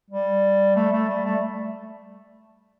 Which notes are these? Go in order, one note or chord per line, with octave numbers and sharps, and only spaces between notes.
G3
A3
A3
G3
A3